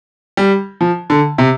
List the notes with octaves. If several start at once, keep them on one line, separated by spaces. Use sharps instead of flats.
G3
F3
D3
C3